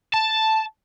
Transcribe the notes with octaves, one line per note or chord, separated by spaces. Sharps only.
A5